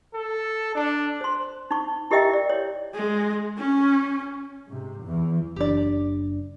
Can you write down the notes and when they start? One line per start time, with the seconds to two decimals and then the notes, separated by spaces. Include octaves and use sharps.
0.15 A4
0.75 D4
1.21 C5 C6
1.71 D#4 C#6
2.11 E4 G4 A#4 D#5 E5 G5
2.33 D5
2.50 C#5
2.94 G#3
3.57 C#4
4.68 G#2 C3
5.04 E2 E3
5.56 F#1 C4 D4 G4 D5